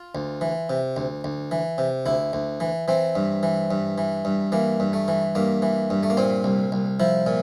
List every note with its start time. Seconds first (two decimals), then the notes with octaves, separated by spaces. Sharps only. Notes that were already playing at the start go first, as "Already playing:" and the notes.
Already playing: F4
0.15 D2
0.41 E3
0.70 C3
0.96 D2
1.24 D2
1.51 E3
1.78 C3
2.06 D2 E4
2.33 D2
2.60 E3
2.88 E3 C4
3.15 G2
3.43 E3
3.71 G2
3.98 E3
4.25 G2
4.52 E3 A#3
4.80 G2
4.93 A3
5.08 E3
5.35 G2 A#3
5.62 E3
5.90 G2
6.03 A3
6.10 A#3
6.17 A#2 C4
6.44 C2
6.72 C2
7.00 F3 E4
7.26 A#2